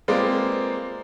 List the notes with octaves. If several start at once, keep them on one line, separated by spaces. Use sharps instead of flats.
G#3 A#3 C4 F4 B4 D5